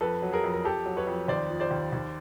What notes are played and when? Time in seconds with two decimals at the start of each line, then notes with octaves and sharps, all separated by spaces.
0.01 F2 A4 B4
0.22 F#3
0.33 G#4 A#4
0.44 F2
0.54 A#4
0.64 F2 G4 A4
0.86 F#3
0.97 B4 C#5
1.07 F2
1.28 D#2 C5 D5
1.50 F3
1.60 C5 D5
1.71 D#2
1.92 D#2